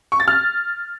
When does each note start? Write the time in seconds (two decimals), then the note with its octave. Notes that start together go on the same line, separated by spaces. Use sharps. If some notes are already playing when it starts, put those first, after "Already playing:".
0.12 C#6
0.20 A6
0.28 F6